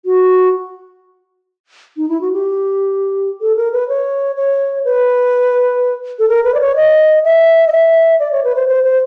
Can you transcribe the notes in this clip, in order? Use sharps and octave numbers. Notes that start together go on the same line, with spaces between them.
F#4
D#4
E4
F#4
G4
A4
A#4
B4
C#5
C#5
B4
A4
A#4
B4
D5
C#5
D#5
E5
D#5
E5
D5
C#5
B4
C5
C5
C5